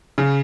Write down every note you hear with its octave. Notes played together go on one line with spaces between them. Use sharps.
C#3